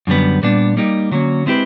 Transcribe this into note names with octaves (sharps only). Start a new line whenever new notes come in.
F#2 D3 G3 B3
A#2 G3 B3 D4
G3 A#3 D#4 G4
D3 F#3 A#3 C#4
G#3 C4 E4 G4 B4